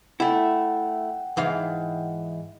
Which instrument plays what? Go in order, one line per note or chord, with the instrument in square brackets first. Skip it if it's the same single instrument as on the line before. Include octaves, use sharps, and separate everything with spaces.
[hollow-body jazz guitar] A3 E4 [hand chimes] F#5 G5
[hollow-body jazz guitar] G#2 E3 F5